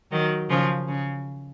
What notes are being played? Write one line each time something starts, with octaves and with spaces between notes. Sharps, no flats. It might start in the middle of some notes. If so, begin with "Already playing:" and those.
D#3 F#3
C#3 F3
C#3